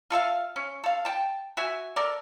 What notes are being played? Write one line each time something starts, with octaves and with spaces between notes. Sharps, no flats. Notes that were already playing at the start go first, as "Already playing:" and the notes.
F4 A4 E5 F5
C#4
A4 F5
G5 A5
F#4 E5 G#5
A4 A#4 D5